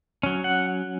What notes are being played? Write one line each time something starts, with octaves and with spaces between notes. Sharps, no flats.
F#3 C#4
F#5